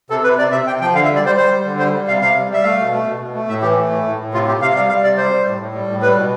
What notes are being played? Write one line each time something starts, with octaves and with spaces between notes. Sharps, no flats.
C3 A4
C3 B4
C3 D5
C3 E5
C3 G5
F3 G5
D3 F5
E5
G3
D5
G3 C5
G3 C5
G3
D3
G3 C5
G3
C3 F5
C3 F5
G3
G3 E5
A3 F5
B2
A3
B2
B2
A3
A2 E5
E3 G4
A3
A2
A2
A2
C3 F4
C3 G4
C3 F5
G3 F5
G3 F5
C3 D5
G3 C5
G3
A2
A2
G3
A2
G3 B4
B2